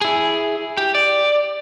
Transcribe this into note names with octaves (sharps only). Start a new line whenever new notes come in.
E4 G#4
G4
D5